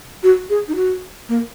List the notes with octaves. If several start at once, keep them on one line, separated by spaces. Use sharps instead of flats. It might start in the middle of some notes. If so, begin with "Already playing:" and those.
F#4
G#4
D#4
F#4
A#3